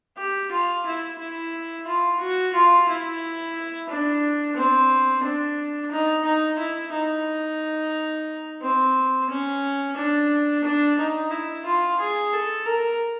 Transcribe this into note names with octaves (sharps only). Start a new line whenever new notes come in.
G4
F4
E4
E4
F4
F#4
F4
E4
D4
C4
D4
D#4
D#4
E4
D#4
C4
C#4
D4
D4
D#4
E4
F4
G#4
A4
A#4